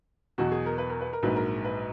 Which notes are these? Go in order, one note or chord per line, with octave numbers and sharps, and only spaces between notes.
E2 B2 F#3 F#4
G#4
A#4
B4
A#4
B4
A#4
A#1 G#2 F#3 B4
A#4
B4